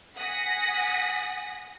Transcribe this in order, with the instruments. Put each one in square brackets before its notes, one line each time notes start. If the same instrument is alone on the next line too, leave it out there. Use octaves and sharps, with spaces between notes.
[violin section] F#5 G#5 D#6 A#6 B6